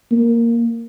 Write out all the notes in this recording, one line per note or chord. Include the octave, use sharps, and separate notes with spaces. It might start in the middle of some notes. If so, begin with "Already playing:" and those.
A#3